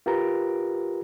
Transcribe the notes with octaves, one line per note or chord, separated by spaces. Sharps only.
F4 G4 A#4 B4 A#5